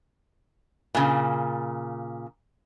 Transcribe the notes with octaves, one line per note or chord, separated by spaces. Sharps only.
A#2 C#3